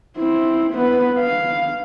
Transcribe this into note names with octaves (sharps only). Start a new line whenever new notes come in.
C4 E4
B3 B4
F5